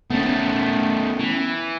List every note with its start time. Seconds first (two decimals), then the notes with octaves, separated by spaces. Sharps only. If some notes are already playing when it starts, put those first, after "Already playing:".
0.10 D#3 A3 B3 C#4
1.20 E3